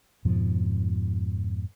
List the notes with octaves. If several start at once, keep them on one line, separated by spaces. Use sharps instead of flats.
F2 G#2 B2 F3